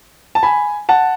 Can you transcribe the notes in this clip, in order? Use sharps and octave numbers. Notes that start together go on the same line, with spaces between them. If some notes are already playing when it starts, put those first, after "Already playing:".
A5
G#5 B5
F#5 A5